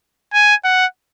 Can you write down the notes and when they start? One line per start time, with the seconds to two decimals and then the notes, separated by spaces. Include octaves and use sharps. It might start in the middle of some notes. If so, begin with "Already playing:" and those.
0.33 G#5
0.65 F#5